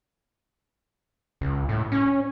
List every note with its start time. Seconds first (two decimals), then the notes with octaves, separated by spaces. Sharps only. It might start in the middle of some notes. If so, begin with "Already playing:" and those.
1.41 C#2
1.69 A2
1.92 C#4